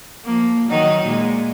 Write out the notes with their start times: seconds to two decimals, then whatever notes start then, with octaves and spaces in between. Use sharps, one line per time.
0.25 F3 A#3
0.68 D#3 F#3 D#4
1.05 A#2 G#3